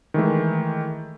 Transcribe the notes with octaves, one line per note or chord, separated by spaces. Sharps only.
D#3 E3 G#3 A3